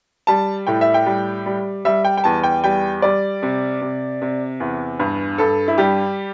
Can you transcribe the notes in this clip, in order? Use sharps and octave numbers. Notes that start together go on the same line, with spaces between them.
G3 A5
A2 G5
E5
G5
G3
G3
G3 E5
G5
G5
E2 A5
G5
G3 G5
G3 D5
C3
C3
C3
E2
G2
G2 A4
E4
G3 G4